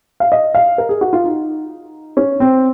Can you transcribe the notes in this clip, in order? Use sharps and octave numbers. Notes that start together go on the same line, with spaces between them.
F5
D#5
F5
A#4
G#4
F#4
F4
D#4
C#4
C4